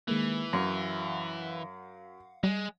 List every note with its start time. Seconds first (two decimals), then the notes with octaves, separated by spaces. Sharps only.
0.08 D#3 E3 G#3 A#3
0.53 F#2 F5 F#5
2.44 G3 G#3